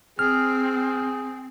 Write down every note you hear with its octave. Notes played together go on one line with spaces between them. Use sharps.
C4 G#4 F6